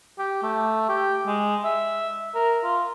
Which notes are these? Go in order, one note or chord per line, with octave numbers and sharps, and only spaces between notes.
G4
A3
G4
G#3
E5
A#4
F4